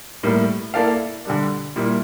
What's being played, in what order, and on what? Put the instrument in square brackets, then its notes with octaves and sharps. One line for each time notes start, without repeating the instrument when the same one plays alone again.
[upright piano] A2 G3 A#3
A#3 E4 A4 D5 F5
D3 G3 D4
A#2 G3 A#3 E4